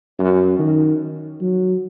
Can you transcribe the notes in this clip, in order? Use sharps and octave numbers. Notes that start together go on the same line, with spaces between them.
F#2
D#3
F#3